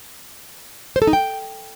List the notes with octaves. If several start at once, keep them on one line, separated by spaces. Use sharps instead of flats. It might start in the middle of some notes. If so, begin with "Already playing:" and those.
C5
A4
D#4
G5